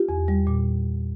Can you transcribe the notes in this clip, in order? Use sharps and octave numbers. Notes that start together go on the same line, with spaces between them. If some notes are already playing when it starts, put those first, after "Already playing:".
Already playing: F4 G4
E2
G3
A#2